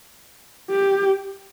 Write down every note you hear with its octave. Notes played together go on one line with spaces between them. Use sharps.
G4